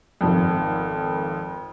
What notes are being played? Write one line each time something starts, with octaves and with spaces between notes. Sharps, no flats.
G#1 F2